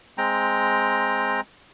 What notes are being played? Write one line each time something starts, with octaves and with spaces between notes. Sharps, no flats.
G#3 C4 G5 A#5